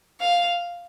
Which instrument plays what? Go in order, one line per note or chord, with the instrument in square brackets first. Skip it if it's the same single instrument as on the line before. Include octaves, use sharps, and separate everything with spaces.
[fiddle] F5